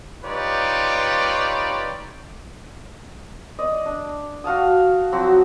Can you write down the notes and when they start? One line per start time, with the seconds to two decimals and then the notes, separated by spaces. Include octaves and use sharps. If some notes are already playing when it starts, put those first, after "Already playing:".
0.24 D#4 F4 G4 B4 C#5 D5
3.59 D5 D#5
3.86 D4
4.44 F#4 F5 A5 D#6
5.12 F3 F#3 C4 F#4